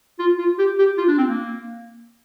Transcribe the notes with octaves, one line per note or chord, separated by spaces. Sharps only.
F4
F4
G4
G4
F4
D4
C4
A#3